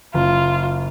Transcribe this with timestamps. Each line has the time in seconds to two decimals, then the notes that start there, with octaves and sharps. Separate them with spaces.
0.14 F#1 F4